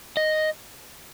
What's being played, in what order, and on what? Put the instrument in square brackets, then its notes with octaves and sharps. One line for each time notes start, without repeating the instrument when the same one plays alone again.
[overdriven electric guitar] D#5